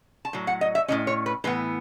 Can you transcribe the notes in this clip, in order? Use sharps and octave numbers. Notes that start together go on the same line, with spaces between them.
A5
A2 F#3
F#5
D#5
E5
A2 F#3 C#4 D#5
C#5
B4
A2 E3 B3 B4